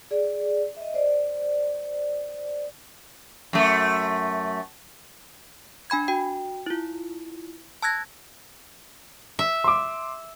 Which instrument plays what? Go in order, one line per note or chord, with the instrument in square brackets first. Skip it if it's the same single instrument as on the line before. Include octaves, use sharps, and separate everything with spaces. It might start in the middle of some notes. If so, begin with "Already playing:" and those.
[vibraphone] G#4 D5
D#5 E5
C5 D5
[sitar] F#2 A3
[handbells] D4 G#5 B5 G#6
F#4 G5
E4 F4
A5 E6 F#6 G#6 A#6
[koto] E5
[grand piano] C6 D6